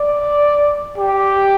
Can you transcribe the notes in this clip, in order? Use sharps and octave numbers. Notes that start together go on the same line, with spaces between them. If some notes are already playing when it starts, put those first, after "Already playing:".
Already playing: D5
G4